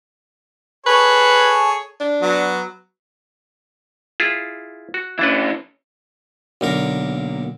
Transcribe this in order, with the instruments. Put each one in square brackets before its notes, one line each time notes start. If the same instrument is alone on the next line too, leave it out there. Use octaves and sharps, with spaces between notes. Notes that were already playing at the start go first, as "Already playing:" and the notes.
[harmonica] G#4 A4 C#5 [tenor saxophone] B4
[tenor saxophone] D4
[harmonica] F#3 B3
[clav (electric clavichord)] E4 F4 G#4
F#4
[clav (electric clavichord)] E3 D4 B4 [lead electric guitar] C#4 E4
[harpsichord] B1 D3 A#4 [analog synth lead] A#3